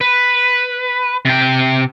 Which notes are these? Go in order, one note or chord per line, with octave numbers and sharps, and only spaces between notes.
B4
C3 G5